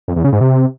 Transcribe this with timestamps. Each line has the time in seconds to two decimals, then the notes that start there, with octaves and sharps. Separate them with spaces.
0.08 F2
0.16 E2
0.24 C#3
0.33 G#2
0.41 C3